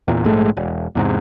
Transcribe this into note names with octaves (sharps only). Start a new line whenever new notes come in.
E2 A#2
A#1 G#2 G#3 A3
E1
E2 G#2 C3